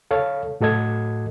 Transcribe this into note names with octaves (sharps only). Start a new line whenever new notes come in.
A4 C#5 F5
A2 F#4 A4 D#5 G#6